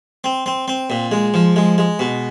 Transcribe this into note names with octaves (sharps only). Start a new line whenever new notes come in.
C4
C4
C4
A#2
G#3
F3
G#3
G#3
B2